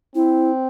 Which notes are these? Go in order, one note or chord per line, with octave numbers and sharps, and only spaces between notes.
C4 E4